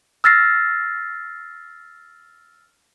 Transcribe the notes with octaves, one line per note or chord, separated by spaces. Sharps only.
E6 F6 A6 A#6 C7